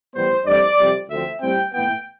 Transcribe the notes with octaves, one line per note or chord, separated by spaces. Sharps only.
A2 E3 G3 B3 C5
G2 E3 A3 C4 D5
F2 C3 G3
D2 D3 F3 C4 E5
A2 G3 C4 G5
A2 E3 B3 G5